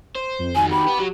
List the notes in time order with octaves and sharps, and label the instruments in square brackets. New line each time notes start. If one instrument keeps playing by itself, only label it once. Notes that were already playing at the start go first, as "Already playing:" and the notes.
[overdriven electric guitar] C5
[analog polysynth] F2
[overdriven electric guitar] D#3 F#4 [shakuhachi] G#5
[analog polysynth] G4 [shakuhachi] B5
[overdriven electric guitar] B3
F#3